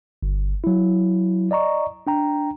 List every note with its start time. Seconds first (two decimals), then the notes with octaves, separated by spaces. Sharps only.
0.23 G1
0.64 F#3 E4
1.51 D5 D#5 A#5 C#6
2.07 D4 G5 A#5